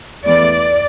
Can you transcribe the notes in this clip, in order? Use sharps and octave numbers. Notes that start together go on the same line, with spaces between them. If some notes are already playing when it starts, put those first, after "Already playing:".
E2 E3 A3 D5